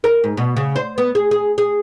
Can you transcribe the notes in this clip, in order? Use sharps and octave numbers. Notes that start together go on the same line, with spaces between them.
A#4
G#2
B2
C#3
C5
B3
G#4
G#4
G#4